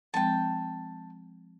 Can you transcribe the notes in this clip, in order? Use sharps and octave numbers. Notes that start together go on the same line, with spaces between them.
F3 G#3 C4 G5 A5